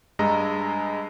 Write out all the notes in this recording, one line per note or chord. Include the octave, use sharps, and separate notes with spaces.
G2 G#3 D#5 A#5 E6